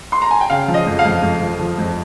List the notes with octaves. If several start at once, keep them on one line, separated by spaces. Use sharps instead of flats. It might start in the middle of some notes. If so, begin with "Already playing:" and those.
C6
A#5
G#5
G5
C#3 F5
F3
D#5
F2
F5
F2
F2
F3
F3
F2